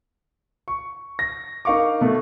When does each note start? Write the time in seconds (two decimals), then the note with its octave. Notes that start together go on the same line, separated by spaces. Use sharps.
0.68 C#6
1.19 A#6
1.65 D#4 A#4 F5 C#6 D6
2.01 B2 A3